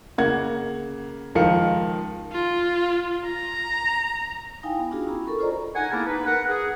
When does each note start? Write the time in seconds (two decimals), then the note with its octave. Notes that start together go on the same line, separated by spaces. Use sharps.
0.18 C#3 A#3 F#5 G#6
1.35 C#2 D#3 F3 A#4 F5 C#7
2.32 F4
3.26 A#5
4.63 D#4 E4 F5 G5 G#5
4.79 B3
4.91 D4 D#4 F4 F#4 G#4
5.06 C#4 E4 F#4 A#5 B5
5.26 A4 A#4 C#6
5.39 F4 A4 C5 D5 D#5 A#5
5.75 D#4 F#5 G#5
5.92 A#3 B3 E4 G#4 A#4 A5
6.06 D#4 B4
6.26 A#4 B4 F#5
6.47 G#4 F#5